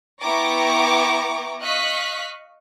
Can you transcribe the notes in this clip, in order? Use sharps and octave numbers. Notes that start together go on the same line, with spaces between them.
B3 E4 G5 A#5 C#6 D6
D#5 F5 C#6 F#6 B6